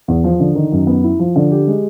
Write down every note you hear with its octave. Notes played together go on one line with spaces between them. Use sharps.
E2
F3
D3
D#3
F#2
B3
E4
F3
D3
G4
G#3